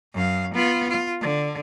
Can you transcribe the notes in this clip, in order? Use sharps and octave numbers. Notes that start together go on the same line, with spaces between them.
F#2 F5
B3 F4
F4
D3